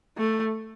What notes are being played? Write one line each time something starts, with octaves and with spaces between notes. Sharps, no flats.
A3